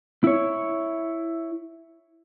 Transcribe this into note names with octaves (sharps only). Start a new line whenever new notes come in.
E4 C#5